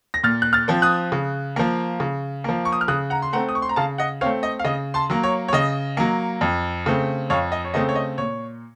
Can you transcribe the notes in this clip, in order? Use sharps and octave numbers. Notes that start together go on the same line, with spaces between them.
A#6
A#2 F6 A6
F#6
F6 A6
F3 C4
D#6 F#6
C#3
F3 A#3
C#3
F3 A#3
C#6
D#6
F6
C#3 D#6 F#6
F#5 A#5
C6
A3 C4 F#5 A#5
D#6
C#6
C6
A#5
C#3 F5 A5
D#5 F#5
A3 C4 C#5 F5
D#5
F5
C#3 D#5
A5 C6
F#3 A#3
C#5
C#5
C#3 D#5
F#3 A#3
F2
C#3 A3 C4
F2 C#5 F5
D#5
C#5
C#3 A3 C4 D#5
C#5
D#5
A#2 C#5